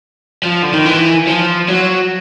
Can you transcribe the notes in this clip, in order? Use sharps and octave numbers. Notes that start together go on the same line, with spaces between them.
F3
D3
D#3
E3
F3
F#3